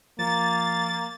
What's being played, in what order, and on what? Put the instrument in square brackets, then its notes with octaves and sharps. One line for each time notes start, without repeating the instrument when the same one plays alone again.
[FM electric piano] F3 [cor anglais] A#3 [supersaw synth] A6